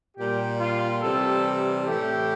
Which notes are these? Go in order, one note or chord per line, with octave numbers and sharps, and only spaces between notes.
A#2 G3 G4
F4
C3 E3 G3 A4
A2 E3 A3 G4